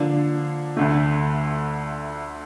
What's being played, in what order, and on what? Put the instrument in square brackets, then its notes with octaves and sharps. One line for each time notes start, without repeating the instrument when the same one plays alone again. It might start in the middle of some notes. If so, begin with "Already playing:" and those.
Already playing: [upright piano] D3 F3 A#3 D4
D2 D3 A3